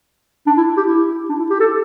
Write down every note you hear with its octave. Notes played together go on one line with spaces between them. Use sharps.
D4
E4
G4
E4
D4
E4
G4
A4